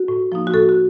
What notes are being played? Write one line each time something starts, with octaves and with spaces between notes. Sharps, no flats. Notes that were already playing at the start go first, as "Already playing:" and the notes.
Already playing: F#4
A2
F3 A#3 D#4
F#4
A2 A4
F#4